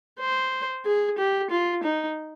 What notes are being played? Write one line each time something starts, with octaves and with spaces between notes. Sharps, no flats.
C5
G#4
G4
F4
D#4